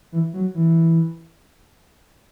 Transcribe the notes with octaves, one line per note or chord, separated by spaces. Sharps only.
E3
F#3
E3